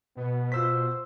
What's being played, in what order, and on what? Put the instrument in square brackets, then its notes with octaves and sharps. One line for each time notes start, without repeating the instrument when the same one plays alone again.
[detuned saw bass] B2 [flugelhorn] B3
[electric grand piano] F4 E6 B6 [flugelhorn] C5